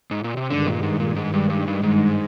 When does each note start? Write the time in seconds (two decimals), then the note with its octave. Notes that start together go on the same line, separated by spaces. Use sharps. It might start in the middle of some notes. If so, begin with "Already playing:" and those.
0.11 G#2
0.24 A#2
0.37 C3
0.50 G2 D3 D#3 G#3
0.67 A#2
0.83 G#2
1.00 A#2
1.16 G#2
1.34 G2
1.50 G2
1.68 G2
1.83 G#2